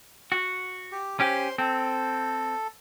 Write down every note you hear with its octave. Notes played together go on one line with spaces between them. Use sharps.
F#4
G4
C#4 G4 C5 C6
C4 A4